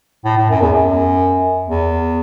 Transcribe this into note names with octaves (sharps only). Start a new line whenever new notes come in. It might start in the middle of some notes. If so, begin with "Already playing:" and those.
A2
A2
F#2
E2
F#2
E2